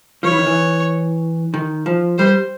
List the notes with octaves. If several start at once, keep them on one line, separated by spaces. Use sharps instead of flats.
F3 C#5
E3
D#3
E3
D#3
F3
G3 C5